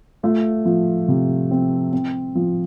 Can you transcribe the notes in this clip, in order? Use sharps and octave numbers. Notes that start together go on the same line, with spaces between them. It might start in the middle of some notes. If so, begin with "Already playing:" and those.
A3 F4
F3
C3
C4
C4
F3